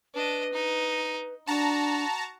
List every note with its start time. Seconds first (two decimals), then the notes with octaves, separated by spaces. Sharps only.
0.14 D4 B4 D#5
0.53 D#4
1.47 D4 F#4 A5 A#5